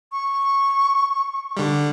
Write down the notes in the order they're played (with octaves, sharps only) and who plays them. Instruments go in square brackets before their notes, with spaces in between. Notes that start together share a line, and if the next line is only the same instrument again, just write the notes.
[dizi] C#6
[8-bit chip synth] D3 G3